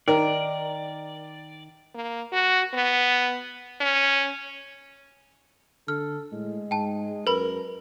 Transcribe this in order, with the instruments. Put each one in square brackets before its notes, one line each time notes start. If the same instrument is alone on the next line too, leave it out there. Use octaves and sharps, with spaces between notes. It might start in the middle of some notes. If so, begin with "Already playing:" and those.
[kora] D#3 [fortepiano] A#4 [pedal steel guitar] D5
[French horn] A#3
F#4
B3
C#4
[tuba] D3 [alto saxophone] A4 [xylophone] F6
[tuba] A2 [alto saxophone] G#3
[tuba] G#2 [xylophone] G5 A5
[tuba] F#2 [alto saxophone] A#4 [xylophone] B4 B5